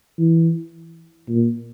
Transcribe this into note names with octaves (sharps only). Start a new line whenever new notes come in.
E3
A#2